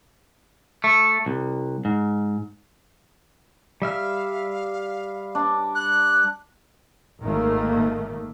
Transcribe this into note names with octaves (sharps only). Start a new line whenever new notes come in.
A3
C2
G#2
G3 E5 F5 F6
D4
F#6
G#1 D#3 A3 A#3